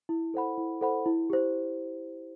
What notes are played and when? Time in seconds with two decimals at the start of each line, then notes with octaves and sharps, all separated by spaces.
0.09 E4
0.34 A4 C5 F#5 B5
0.58 E4
0.81 A4 C5 F#5 B5
1.06 E4
1.30 G4 C5